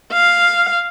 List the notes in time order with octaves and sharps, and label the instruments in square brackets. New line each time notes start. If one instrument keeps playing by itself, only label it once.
[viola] F5